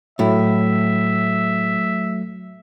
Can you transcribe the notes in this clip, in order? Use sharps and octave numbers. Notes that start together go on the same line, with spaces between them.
A2 F#3 A3 E4 E5